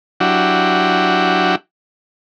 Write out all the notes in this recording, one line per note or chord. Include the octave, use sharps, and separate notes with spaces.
F#3 D4 E4 F#4 G4